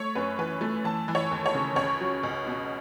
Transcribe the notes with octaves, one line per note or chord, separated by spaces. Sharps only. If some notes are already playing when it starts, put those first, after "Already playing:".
Already playing: A3 C#5
F#2 B4
E3 B4
A3
E3 A5
E3
C#5
D#2
C#5
C#3
C#2 C#5
F#3
C#2
B2